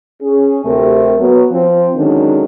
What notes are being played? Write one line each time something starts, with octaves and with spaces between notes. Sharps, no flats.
C#4 G#4
D2 C3 A3 C4 G4 A#4
F#3 B3
F3 C4 F4
D3 D#3 F#3 G#3 C#4 D4